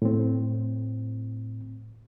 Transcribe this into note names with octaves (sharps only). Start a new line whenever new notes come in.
A2 C4